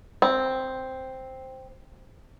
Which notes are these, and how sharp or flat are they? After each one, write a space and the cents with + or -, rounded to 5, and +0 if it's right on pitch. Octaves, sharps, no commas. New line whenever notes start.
C4 +0